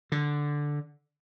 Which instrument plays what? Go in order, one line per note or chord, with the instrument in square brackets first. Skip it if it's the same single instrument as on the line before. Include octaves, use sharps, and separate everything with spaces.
[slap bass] D3